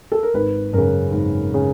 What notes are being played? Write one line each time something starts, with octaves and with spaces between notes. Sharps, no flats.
A4
A#4
G#1 B4
F#2 C#3 A#4
G#1
C#3